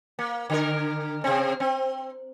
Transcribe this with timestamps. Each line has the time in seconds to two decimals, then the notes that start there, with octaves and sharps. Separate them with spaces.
0.19 A#3
0.50 D3 A#4
1.24 C3 C4
1.60 C4